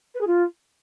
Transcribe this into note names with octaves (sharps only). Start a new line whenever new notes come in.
B4
G#4
F4